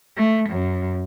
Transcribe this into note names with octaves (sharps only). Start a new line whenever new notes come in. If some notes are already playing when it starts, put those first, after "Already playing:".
A3
F#2